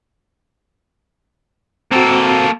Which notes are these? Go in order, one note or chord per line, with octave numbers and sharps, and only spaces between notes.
A#3 C4 F#4 A4